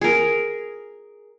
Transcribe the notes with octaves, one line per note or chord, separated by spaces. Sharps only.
G#4 A#4